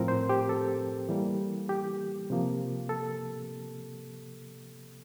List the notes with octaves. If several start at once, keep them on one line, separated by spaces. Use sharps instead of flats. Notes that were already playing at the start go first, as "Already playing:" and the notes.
Already playing: A2 F3 C4 A#4
C5
G4
A4
E3 G3 A#3
G4
C3 F3 A#3
A4